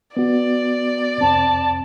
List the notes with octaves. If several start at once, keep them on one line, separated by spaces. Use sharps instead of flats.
B3 F#4 D5
C2 F2 C4 A5